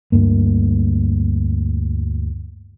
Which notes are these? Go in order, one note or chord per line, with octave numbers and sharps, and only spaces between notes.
D2 G2 A#3